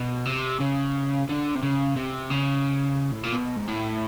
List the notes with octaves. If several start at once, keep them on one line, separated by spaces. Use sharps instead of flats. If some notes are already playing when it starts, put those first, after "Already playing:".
Already playing: B2
C3
C#3
D3
C3
C#3
C3
C#3
A2
A#2
B2
G#2
A2